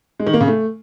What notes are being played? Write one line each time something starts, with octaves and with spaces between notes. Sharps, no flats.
G#3
D#3
A#3
C#3
A3